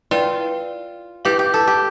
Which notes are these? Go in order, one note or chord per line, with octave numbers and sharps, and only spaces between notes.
E4 F4 B4 D5 G5
E4 G4 B4 F5
G4
A4
G4